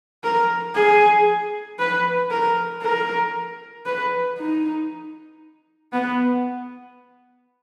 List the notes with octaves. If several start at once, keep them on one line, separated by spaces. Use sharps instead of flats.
A#4
G#4
B4
A#4
A#4
B4
D#4
B3